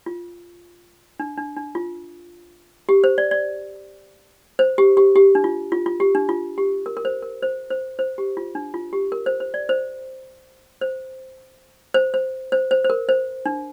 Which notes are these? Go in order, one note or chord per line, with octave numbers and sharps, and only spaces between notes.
F4
D4
D4
D4
F4
G4
C5
D5
D5
C5
G4
G4
G4
D4
F4
F4
F4
G4
D4
F4
G4
A#4
A#4
C5
A#4
C5
C5
C5
G4
F4
D4
F4
G4
A#4
C5
C5
D5
C5
C5
C5
C5
C5
C5
C5
A#4
C5
D4